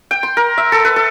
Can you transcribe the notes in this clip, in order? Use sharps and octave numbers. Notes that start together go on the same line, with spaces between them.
G5
C6
A#4
E5
A4
B4
A4